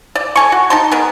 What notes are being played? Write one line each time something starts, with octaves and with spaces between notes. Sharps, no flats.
D5
A4 G#5 C#6
F#4
D#4 A5 C6
B3 G#4 A#4